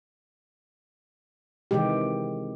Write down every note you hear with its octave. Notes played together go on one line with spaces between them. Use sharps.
C3 D#3 E3 G#3 G4